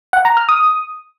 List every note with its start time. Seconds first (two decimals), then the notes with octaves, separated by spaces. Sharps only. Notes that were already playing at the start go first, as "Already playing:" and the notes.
0.13 F#5
0.25 A#5
0.37 F6
0.49 D#6